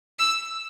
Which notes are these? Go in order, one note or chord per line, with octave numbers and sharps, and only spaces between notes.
E6